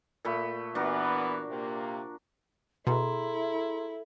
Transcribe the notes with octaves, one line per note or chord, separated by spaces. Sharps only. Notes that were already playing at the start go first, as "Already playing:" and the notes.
A#2 A3 B5
E3 B3 D4 F#4 A#4
C3 A#3
B2 E4 G#4 A4 A#5 C6